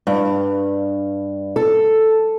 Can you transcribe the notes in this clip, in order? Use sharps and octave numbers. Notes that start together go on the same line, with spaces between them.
G2
A4